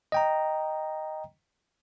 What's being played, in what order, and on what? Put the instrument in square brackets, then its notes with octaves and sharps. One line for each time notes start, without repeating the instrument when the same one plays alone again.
[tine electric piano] D#5 G5 A#5